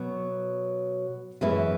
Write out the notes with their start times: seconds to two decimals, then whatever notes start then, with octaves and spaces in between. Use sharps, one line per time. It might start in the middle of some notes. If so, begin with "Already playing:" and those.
Already playing: B2 F#3 B3 F#4
1.41 F#2 E3 G#3 B3 E4